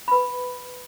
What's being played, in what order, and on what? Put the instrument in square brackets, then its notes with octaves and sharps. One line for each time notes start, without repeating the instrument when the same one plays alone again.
[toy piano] B4 B5